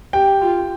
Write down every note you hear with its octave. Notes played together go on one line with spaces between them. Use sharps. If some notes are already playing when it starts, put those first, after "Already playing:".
G4 G5
F4